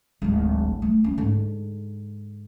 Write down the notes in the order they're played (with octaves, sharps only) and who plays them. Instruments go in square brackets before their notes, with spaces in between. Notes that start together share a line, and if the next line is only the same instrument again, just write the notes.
[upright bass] D1 G#1
A3
C#4
G#2 D3